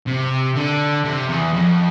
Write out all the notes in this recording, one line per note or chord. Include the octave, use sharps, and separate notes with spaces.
C3
D3
C3
E2
F2